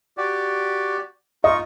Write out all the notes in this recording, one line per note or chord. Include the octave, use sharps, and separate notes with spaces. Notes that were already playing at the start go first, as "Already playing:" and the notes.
F#4 G4 D5
D#4 F4 D#5 C#6